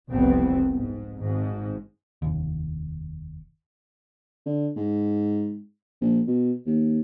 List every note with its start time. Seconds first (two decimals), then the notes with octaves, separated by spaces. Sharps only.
0.11 F1 C2 E3 B3 C4
0.72 G#2
1.19 G#1 G#2
2.22 F1 D#2
4.46 D3
4.76 G#2
6.01 A#1
6.28 B2
6.66 D#2